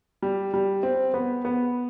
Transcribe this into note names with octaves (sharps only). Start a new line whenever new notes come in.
G3
G3
C4
B3
B3